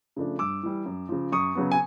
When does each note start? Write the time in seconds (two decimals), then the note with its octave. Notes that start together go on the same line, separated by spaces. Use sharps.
0.16 C#3 F3 A3 D4
0.39 G2 D6 E6
0.63 E3 G3
0.86 F#2
1.09 C#3 F3
1.32 F#2 C#6 D#6
1.55 C#3 F#3 B3
1.72 G#5